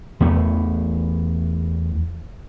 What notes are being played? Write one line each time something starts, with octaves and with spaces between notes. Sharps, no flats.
E2 E3 A3